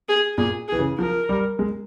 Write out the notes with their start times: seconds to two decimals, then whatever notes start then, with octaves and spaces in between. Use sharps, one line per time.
0.09 G#4
0.38 A#2 G#4
0.68 E3 G#4
0.79 C#3
0.98 F3 A#4
1.29 G3
1.59 G#3